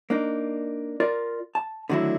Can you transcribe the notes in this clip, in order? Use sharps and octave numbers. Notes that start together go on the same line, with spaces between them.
A#3 D4 D#4
F4 A#4 D5
A5
D3 D#3 F#3 A3 E4